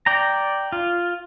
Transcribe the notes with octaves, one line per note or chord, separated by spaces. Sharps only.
D5 G5 A#5
F4